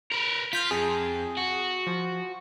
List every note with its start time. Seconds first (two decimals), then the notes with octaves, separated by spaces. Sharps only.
0.11 A#4 B4
0.53 F4 F6 G6 B6
0.71 F2 G#4
1.37 F#4
1.87 F3